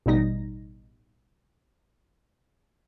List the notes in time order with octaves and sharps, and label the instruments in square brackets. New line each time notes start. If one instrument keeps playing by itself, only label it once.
[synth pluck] A1 B2 G3 D#4 A#6